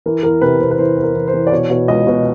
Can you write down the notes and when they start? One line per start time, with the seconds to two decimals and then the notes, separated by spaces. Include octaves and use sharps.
0.06 E3 A#4
0.23 E2 A#4
0.41 C3 B4
0.60 C3 C5
0.71 B4
0.78 E3 C5
0.97 E2
1.03 A#4
1.15 E2
1.27 C5
1.34 E3
1.47 D5
1.52 B2 C#5
1.70 B2
1.88 C#2 D#5
2.07 B2